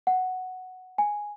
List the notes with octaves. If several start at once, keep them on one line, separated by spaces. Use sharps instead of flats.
F#5
G#5